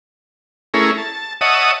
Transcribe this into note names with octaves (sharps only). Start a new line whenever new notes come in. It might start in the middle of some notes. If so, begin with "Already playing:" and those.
A3 C#4 E4 G#4 A#4
A5
C#5 D#5 E5 F#5 A5 D#6